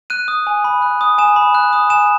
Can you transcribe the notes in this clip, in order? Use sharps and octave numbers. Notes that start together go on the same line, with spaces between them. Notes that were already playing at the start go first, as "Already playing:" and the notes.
F#6 D#7
D#6
G#5
B5
F#6
D#6
G#5 E7
B5
F#6
D#6
G#5 E7